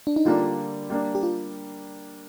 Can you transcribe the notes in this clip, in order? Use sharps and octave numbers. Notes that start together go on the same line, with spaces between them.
D4
D#4
D3 G3 A#3 D4 F4
G3 A#3 D4
G4
F4